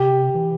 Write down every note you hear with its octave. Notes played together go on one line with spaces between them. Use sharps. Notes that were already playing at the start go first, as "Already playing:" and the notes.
Already playing: C3 G4
E3